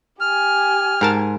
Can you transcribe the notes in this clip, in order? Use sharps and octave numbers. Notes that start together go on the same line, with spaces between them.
G4 G#5 F6
G#2 A#4 A5